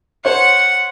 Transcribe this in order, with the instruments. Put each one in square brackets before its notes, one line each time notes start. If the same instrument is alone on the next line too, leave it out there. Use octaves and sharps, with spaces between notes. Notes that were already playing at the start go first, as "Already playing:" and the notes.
[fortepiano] C5 C#5 [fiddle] F#5